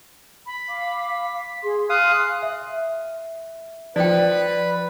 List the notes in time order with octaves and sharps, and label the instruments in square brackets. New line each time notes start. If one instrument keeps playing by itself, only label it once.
[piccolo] B5
[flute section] F5 D6
[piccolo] B6
[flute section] G#4 C6
[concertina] F5 D#6 [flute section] G#5 C6 [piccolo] F#6
[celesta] E5
[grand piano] F3 [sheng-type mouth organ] B4 B5 [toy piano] D5 G5